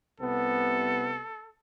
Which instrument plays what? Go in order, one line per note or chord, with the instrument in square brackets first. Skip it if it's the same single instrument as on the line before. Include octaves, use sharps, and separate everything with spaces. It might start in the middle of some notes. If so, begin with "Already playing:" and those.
[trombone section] C2 C3 B3 [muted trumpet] A4